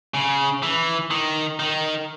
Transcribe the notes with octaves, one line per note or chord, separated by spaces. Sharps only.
C#3
E3
D#3
D#3